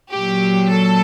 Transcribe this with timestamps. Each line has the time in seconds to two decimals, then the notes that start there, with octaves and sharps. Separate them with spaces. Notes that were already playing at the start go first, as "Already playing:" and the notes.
0.12 A#2 F#3 G4
0.70 A4